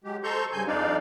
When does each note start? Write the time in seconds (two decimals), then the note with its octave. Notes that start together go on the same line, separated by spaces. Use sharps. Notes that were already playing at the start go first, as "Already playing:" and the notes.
0.04 F#3 G#3 G4
0.23 A4 C5 A#5 C6 C#6 G6
0.52 G2 C#3 G#5 G6
0.67 F2 D4 D#4 D5 F5